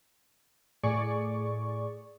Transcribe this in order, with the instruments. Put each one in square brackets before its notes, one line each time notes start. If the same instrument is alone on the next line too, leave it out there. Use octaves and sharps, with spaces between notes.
[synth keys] A2 G#4 D5 C#6